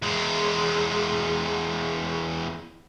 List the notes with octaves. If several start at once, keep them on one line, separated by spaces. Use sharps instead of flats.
E2 G#3